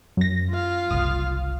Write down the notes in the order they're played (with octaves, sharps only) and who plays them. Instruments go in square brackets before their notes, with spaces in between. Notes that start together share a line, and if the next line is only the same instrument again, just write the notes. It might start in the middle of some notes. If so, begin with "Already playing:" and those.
[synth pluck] F#2 A#6
[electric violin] F4 F5
[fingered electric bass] F#1 C2 [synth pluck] D#6